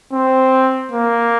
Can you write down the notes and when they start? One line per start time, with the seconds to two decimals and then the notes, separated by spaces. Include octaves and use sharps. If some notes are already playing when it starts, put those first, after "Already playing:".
0.13 C4
0.92 A#3